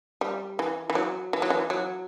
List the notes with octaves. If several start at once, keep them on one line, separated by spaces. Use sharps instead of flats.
G3
E3
E3
F#3
E3
F#3
E3
F#3